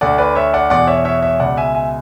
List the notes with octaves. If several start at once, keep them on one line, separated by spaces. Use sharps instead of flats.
D2 D3 D5 F#5
B4 D5
C#5 E5
D5 F#5
E2 B2 D5 F#5
C#5 E5
C#5 E5
C#5 E5
C#2 B2 D5 F#5
E5 G#5
E5 G#5